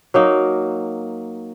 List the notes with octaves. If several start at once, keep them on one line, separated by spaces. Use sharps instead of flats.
F#3 A#3 D#4